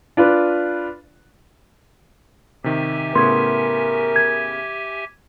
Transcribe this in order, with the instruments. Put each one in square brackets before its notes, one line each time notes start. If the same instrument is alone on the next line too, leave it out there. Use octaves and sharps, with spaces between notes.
[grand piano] D4 F4 B4
[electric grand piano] C3 D#3 [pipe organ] G4 E5 G#5
[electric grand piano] A2 C#3 B3 [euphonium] A#4 [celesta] C6 G#6
[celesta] G#6